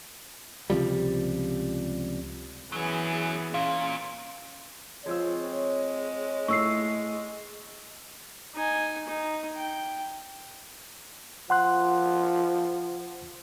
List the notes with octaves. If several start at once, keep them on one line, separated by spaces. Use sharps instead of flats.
C#2 C3 F3 G3
E3 F#3 B3 C#4 G#4
A#2 C#4 F5
F3 G#3 C4 F4 C#5 E6
A2 C#6 E6 C7
D#4 G#5
D#4
G5
F3 F#5 C6 F#6